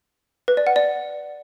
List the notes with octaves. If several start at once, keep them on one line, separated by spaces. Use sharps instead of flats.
B4
D5
F#5
D5